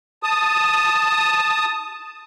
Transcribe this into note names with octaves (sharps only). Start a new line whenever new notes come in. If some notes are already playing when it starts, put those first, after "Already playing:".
A5 D#6